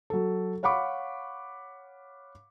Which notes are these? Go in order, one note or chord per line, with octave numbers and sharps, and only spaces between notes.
F#3 A4
C#5 F5 F#5 B5 C#6 D6